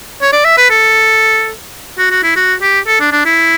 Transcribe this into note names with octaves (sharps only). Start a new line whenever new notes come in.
C#5
D5
E5
B4
A4
F#4
F#4
E4
F#4
G4
A4
D4
D4
E4